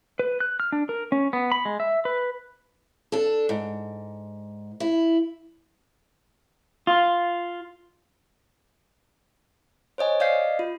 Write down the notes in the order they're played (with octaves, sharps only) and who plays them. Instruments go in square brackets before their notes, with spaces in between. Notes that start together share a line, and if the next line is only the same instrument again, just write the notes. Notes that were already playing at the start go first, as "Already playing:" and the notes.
[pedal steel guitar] B4
F#6
F6
D4
A#4
C#4
B3
B5
G#3
E5
B4
[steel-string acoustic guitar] D4 A4
G#2
E4
[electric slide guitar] F4
[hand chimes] C5 C#5 D#5 G#5
D5 D#5 F5 G6 C7
F4